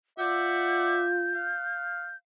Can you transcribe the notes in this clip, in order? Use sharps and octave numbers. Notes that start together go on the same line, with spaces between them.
F4 D5 E5 F#5 G6
F5